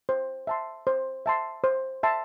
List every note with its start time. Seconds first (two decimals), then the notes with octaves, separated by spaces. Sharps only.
0.09 C5
0.47 E5 A5 C6
0.87 C5
1.26 E5 A5 C6
1.64 C5
2.03 E5 A5 C6